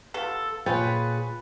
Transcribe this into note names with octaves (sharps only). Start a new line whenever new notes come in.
B3 F4 A4
A#2 F4 G#4 B4 C#5 G5 A6